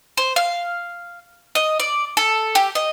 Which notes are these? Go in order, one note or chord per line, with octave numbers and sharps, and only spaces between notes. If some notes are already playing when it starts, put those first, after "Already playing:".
C5
F5
D#5
D5
A4
G4
D#5